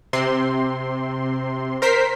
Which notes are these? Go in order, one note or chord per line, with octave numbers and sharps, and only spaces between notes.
C3 C4 C6
A#4 C5 B6 C7